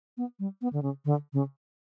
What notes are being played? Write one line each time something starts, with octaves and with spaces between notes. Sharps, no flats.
B3
G3
B3
D3
C#3
D3
C#3